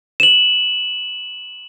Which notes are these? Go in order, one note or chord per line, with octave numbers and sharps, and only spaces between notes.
E7 F#7